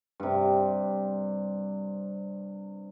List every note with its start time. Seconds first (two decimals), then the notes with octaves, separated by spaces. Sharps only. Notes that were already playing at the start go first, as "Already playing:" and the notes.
0.20 G2 C3